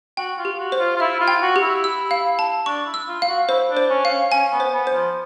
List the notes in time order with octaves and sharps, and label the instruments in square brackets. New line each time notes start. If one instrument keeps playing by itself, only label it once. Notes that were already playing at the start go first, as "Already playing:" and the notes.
[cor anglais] F#4 [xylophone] G5
[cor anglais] F4
[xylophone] G4
[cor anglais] F#4
[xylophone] C5
[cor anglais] F4
F4
[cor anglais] E4 [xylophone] E5
[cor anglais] F4
[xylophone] G5
[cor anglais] F#4
[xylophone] G4
[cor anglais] E4
[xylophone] E6
F5
A5
[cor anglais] D4 [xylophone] C#6
[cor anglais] E4
[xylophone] E6
[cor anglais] F4
[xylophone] F5
[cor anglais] F#4
[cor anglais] E4 [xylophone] C5
[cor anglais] D4
[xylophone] C5
[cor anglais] C#4
[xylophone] F5
[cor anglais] C#4
[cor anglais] C#4 [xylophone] G#5
[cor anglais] B3
[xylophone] C5
[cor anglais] B3
[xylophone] C5
[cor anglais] F3